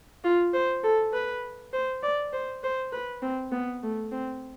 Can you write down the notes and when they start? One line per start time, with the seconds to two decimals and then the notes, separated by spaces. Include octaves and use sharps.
0.24 F4
0.53 C5
0.83 A4
1.13 B4
1.73 C5
2.03 D5
2.33 C5
2.63 C5
2.92 B4
3.22 C4
3.52 B3
3.83 A3
4.12 C4